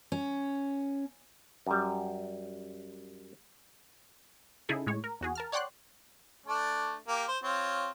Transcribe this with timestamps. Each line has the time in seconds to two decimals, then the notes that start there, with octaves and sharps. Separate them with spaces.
0.12 C#4
1.66 F#2 G3
4.69 C#3 D#4 E4 G#4 A4
4.87 A2 G#3 C#5
5.04 A#4
5.21 E2 F#4 G#4
5.35 A#4 A5 F6
5.52 C#5 D5 F#5 G5 C6 F#6
6.46 A3 D4
7.08 A#3 G4
7.28 C5
7.43 C4 F4 C#5